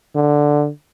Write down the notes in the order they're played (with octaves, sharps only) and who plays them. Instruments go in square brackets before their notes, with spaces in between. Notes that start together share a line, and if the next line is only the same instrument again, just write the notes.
[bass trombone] D3